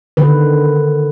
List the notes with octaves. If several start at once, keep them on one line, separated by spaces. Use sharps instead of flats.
D3 D#3 B4